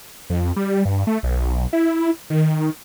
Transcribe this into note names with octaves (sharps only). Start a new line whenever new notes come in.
F2
G3
G2
A3
B1
E4
D#3